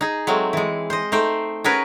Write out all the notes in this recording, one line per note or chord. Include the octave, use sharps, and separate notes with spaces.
D#4 G#4
F#3 G#3 A3 C4
E3 G#3
C5 D#5
A3 D#4 C5 G5
C#4 F#4 G#4 A#4 B4